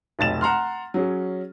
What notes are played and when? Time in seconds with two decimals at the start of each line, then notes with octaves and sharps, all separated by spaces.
0.19 F1 B1 A6 E7
0.41 F#5 A#5 C6 F6
0.94 F#3 C#4 G#4